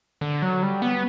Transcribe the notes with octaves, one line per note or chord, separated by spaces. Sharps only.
D3
F#3
G3
B3